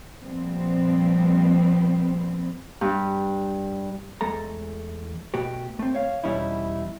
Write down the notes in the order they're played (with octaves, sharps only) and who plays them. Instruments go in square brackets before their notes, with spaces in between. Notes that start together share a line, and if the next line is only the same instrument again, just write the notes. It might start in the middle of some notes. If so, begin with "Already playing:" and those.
[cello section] A#2 F3 G3 B3 C4
[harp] G2
[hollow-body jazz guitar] E2 G#3 A3 A4 A#5
B2 A3 F#4 G4
A3 C4
C#5 F5
E2 B2 G3 C#4 D#4 E4